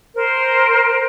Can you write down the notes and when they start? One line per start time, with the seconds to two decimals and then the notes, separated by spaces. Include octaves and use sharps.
0.15 A#4 C5